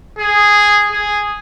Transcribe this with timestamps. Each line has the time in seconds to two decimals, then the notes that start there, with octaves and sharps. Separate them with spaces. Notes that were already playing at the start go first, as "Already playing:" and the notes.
0.19 G#4
0.92 G#4